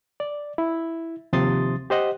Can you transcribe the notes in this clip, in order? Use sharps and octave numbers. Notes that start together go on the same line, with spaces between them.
D5
E4
D#2 C3 F3 C6 D#6 A6
G4 C5 D#5 F#5